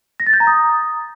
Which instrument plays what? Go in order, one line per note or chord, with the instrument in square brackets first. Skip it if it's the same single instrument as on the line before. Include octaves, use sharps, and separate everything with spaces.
[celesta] A#6
A6
G6
A#5
D#6